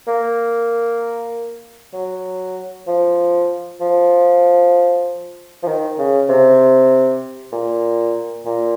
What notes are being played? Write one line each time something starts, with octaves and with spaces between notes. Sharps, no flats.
A#3
F#3
F3
F3
F3
D#3
C#3
C3
A#2
A#2